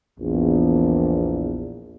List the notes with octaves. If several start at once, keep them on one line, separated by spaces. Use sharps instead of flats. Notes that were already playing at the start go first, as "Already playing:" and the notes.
A#1 E2